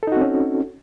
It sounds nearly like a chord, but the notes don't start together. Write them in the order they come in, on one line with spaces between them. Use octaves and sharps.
A4 D#4 F#4 C4 C#4